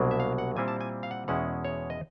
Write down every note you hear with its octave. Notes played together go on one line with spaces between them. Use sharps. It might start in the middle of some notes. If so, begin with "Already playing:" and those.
Already playing: C2 B2 F#3 A#3 D4
E5
F5
F#5
A#2 G3 C4 E4 G#5
A5
G#5
F5
F#5
E2 B2 G#3 C#4 E4 F#5
C#5
D#5